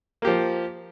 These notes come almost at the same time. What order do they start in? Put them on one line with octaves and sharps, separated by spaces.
A#3 G4 F3